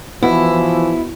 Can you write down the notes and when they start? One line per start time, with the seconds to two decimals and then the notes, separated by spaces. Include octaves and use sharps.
0.23 E3 F3 B3 E4 F#4